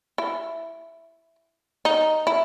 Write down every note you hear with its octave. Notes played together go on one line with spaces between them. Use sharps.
E4
D#4
E4